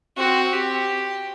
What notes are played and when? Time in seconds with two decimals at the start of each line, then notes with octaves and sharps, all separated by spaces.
0.18 C4 F#4
0.53 C4 G4